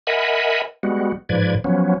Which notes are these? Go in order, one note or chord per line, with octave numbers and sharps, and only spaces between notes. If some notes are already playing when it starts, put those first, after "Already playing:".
A#4 D#5 E5 F#5 G#5 B5
G3 G#3 B3 F#4
G#2 F3 B4 D5 G#6
F3 F#3 B3 C#4